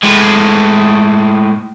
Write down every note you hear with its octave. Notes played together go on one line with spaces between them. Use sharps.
A2 G#3